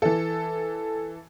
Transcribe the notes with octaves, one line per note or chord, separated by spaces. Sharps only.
E3 A4